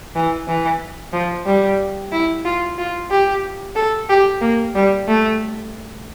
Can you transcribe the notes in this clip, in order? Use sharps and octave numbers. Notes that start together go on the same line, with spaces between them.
E3
E3
F3
G3
E4
F4
F4
G4
A4
G4
A#3
G3
A3